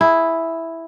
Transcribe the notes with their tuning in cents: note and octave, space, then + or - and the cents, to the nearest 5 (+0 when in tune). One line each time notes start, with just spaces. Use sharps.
E4 +0 G#4 +0